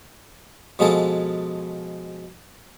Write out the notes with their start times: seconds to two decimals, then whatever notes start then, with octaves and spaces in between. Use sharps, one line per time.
0.79 B2 F3 G#3 G#4 A4